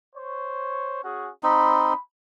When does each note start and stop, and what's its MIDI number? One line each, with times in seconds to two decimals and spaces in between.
0.15 1.00 72
0.15 1.00 73
1.04 1.30 61
1.04 1.30 66
1.04 1.30 68
1.43 1.93 60
1.43 1.93 63
1.43 1.99 83